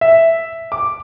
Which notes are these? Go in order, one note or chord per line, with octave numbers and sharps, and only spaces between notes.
E5
D6